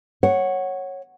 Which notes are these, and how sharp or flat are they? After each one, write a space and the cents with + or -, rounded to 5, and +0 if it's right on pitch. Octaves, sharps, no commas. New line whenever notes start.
C#5 -10 F#5 +0